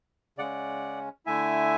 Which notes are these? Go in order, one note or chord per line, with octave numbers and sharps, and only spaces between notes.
C#3 G#3 C#4 D5 F#5
D3 A3 E4 E5 G#5